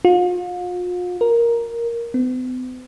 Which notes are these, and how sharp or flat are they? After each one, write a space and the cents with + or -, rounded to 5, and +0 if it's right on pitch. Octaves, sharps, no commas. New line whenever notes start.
F4 +40
A#4 +5
B3 +45